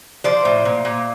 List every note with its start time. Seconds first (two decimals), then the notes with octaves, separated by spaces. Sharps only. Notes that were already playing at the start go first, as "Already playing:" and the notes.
0.24 F3 C5 D5
0.45 A2
0.65 A#2
0.85 A#2